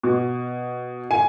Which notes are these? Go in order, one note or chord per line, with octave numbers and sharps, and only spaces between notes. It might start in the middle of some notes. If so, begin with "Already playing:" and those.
B2
G#5